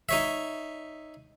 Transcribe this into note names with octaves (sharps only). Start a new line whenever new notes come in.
D#4 C#5 E5